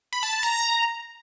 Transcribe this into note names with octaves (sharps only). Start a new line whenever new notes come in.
B5
A5
A5
A#5